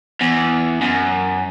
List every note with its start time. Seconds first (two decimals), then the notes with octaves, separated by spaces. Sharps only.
0.21 E2
0.82 F#2